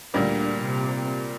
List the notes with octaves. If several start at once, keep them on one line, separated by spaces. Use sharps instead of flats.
D2 A#2 D3 G3 A#3
C3 C4